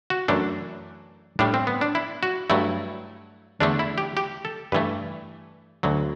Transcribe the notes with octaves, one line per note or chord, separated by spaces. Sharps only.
F#4
F#2 E3 A3 D4
A2 G3 D4
C4
B3
D4
E4
F#4
G2 F#3 A3 E4
E2 D3 A3 D4
E4
G4
G4
A4
G2 E3 A3 B4
D2 D3 F#3